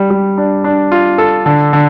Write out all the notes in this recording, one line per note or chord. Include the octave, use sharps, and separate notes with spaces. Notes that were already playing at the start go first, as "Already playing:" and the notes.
Already playing: G3
G3
D4
D4
F4
A4
D3
D3